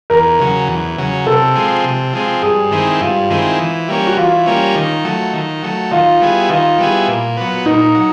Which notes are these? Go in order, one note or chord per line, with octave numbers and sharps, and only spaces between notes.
E2 A#4
C#3 F#3
E2
C#3 F#3
C3 A4
F3 G#3 C4
C3
F3 G#3 C4
G2 G#4
D#3 G#3 C4 E4
G2 F4
D#3 G#3 C4 E4
E3
G3 A#3 C#4
F#4
E3 F4
G3 A#3 C#4
D#3
F#3 A3
D#3
F#3 A3
D#3 F4
G3 B3 E4 G#4
D#3 F4
G3 B3 E4 G#4
A#2
F#3 B3
A#2 D#4
F#3